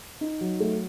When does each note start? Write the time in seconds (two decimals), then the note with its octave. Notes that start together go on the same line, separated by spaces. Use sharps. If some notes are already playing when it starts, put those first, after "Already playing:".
0.21 D#4
0.41 F#3
0.60 A3